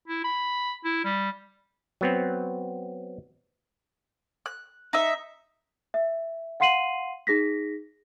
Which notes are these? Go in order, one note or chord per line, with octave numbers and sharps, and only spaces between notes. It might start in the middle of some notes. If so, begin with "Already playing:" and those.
E4
B5
E4
G3
F#3 B3 C4
F#6
D#4 E5
E5
F5 F#5 C6 C7 D#7 F#7
D#4 G#4 A#6 B6